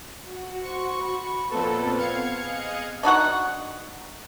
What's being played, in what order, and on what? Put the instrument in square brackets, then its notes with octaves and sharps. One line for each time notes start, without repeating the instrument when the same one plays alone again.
[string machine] F#4
[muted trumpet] C5 [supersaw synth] C#6
[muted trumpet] B5
[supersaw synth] F2 A#2 A4 [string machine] B3 C4 [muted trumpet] B4
[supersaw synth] F5 G#6 C#7
[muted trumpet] G#4 [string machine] D#5 D#6 F#6
[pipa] D4 D#4 F#4 F#5